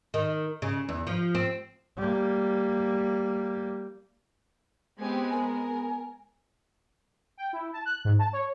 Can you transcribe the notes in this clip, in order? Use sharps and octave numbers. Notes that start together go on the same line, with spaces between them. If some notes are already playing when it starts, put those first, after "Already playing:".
D#3
C#3
E2
F3
C4
G3 A#3
G#3 B3 C4 G4 G#5
A#4 G#5
G5
E4
A5
F#6
G#2
A5
C#5